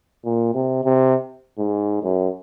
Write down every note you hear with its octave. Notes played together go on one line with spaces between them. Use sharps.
A#2
C3
C3
G#2
F#2